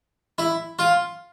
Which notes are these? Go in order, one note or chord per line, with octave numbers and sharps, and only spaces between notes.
E4
F4